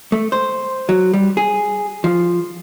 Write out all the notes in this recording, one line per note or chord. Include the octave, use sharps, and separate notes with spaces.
A3
C5
F#3
G3
G#4
F3